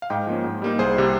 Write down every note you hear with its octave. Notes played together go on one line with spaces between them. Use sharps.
F5
G#2 D#5 G5
F3 A#3 C#4
G#2
G3 A#3 D#4
C2 G#4 C5
C3 G3